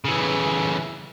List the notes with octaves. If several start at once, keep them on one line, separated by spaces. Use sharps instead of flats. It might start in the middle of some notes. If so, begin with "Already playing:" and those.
C#3 E3